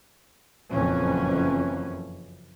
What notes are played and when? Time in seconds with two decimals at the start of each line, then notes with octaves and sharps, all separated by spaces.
0.74 F#1 F2 A#2 E3 F#3 C#4